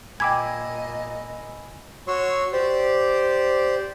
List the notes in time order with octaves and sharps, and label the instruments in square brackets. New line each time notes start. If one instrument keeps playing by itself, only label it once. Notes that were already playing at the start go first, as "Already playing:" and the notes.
[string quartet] A#2 D#5 [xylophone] G5 D6 G#6 [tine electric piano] G#5 B5 E6
[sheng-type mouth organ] F#4 C#5 C6 C#6 E6
G4 C5 D5